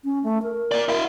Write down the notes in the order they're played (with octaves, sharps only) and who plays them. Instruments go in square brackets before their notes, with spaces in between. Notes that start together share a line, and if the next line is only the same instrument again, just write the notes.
[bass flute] C#4
A3
A#4
[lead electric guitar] A#3 D5
E4 F5